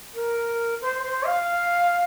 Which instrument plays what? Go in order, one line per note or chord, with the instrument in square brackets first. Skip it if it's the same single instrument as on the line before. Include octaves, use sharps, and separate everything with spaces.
[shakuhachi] A#4
C5
C5
F5